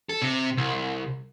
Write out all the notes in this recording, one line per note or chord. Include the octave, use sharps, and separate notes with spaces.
A4
C3
C2